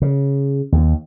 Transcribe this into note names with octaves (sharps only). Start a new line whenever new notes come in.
C#3
D#2